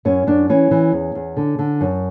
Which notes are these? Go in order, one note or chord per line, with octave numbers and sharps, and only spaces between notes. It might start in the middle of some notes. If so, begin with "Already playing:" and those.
F#2 C#4
F#2 D4
E3 C#4
E3
E2
E2
D3
D3
F#2